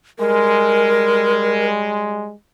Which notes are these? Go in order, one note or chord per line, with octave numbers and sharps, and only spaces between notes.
G3 G#3 A#4